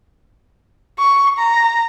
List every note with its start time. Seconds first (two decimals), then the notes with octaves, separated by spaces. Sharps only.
0.99 C#6
1.39 A#5